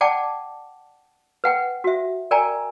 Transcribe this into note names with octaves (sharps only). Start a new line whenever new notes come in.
D5 F#5 G5 A5 D6
B4 F#5 G5
F#4 E5
A#4 D5 G5 G#5 A#5